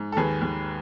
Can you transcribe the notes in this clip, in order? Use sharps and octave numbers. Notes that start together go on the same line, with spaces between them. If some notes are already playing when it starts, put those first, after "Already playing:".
Already playing: G#2
A4
D#2 G#4 B4
D#2